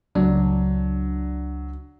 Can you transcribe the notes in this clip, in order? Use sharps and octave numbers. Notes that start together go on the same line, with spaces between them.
C#2 F#3 D4